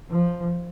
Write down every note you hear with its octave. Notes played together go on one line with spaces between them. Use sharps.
F3